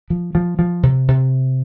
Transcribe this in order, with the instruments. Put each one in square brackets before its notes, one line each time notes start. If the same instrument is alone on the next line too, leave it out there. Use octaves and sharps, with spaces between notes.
[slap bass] F3
F3
F3
C3
C3